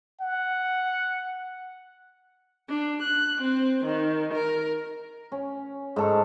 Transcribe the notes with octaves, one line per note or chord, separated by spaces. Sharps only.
F#5
D4
F#6
C4
D#3
A#4
C#4
G#2 A4 C#6